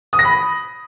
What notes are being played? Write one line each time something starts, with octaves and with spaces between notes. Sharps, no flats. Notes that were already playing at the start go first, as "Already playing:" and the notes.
D#6
A#6
B5